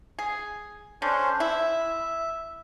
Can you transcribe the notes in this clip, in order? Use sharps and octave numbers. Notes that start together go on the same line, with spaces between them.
G#4
D3 C#4 D4 C5
E4 E5